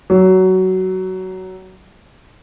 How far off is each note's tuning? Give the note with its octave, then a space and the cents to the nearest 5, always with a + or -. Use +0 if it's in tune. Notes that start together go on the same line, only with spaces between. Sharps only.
F#3 +15